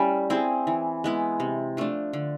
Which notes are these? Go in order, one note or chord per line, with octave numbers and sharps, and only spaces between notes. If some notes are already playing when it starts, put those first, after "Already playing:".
Already playing: G3 A3 C#4 E4
C4 E4 G#4
E3
G#3 B3 E4
C3
F3 A3 D4
D3